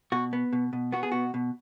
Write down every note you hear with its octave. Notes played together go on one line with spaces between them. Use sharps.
B2 F#4
B3
B2
B2
B3 F#4
G#4
B2 F#4
B2